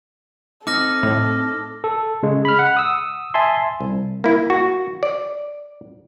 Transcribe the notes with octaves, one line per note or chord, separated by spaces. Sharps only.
C4 D#4 A4 D6 F6 A#6
A2
A4
C#3 G#3
B5 F6
F#5
D#6 E6
E5 G#5 A5 C6
C2
A#3 E4
F#4
D5